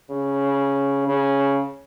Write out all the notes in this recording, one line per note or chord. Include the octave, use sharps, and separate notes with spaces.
C#3
C#3